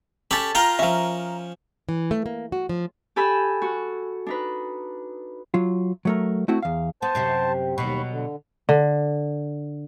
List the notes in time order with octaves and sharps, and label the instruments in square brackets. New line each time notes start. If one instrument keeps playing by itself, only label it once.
[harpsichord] C#4 G4 B5 [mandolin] A4 A5
[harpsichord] F4 F5 G5 [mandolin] A#4
[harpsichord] F3 C#4 [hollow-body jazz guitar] E5 F5
[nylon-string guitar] E3
A3
A#3
F#4
F3
[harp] G4 A4 G#5 B5 E6
F#4
D4 D#4 B4
[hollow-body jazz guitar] F#3 F4
F#3 A3 A#4
A3 C4 E4 F#4
E2 F5
[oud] B3 [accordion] C5 A5
[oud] F#2 C3 C4
[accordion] D#2 B5 C#6 [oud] B2 F#3
[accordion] D3
[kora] D3